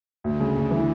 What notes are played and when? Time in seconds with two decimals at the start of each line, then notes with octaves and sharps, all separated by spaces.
0.24 D2 D3
0.40 C#3
0.56 D2
0.71 E3